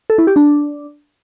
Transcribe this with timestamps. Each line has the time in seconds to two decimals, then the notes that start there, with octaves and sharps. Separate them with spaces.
0.10 A4
0.18 E4
0.27 G4
0.36 D4